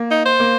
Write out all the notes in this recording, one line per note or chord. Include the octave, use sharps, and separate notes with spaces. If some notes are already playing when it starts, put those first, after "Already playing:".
Already playing: A#3
D#4
C5
A#3